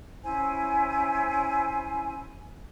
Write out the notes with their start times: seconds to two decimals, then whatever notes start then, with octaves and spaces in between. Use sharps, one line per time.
0.23 C#4 E4 C5 G#5